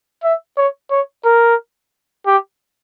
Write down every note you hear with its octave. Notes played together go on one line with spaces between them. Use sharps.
E5
C#5
C#5
A#4
G4